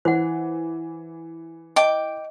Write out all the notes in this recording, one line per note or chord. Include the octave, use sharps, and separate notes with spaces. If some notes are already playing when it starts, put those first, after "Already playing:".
E3 C5 F#5
D#5 G5 D6